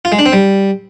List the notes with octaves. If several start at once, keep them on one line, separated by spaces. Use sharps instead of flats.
F4
G#3
D4
C4
G3